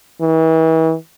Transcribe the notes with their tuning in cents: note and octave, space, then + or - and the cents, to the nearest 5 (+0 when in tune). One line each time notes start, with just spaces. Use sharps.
E3 -35